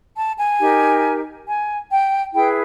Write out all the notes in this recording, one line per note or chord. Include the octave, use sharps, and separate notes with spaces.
A5
G#5
D#4 G4 A#4
G#5
G5
E4 G#4 B4 G5